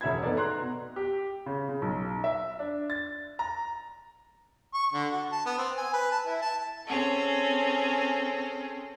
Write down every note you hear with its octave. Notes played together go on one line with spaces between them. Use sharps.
E1 C#4 E5 B5 G#6
B3 D#4 A4 B4 D5
A#5 C6 F#6
B2
G4
C#3
C#3
B1
E5
D4
A6
A#5
C#6
D3
F#4
A5
B3
C4
G#5
B4
A5
E4
A5
C4 C#4 G#4 A4